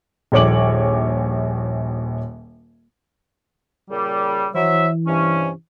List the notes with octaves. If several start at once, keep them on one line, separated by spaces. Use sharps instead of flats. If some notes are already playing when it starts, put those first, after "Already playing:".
D#1 A#1 C#5 D6 F#7
A#2 C#3 G3
E3 F#3 C5 E5
G2 C3 C#4